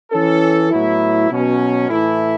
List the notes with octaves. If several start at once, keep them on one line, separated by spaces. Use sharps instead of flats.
E3 C#4 A4
A2 F#3 B3 E4
B2 F#3 C#4
A2 E3 A3 E4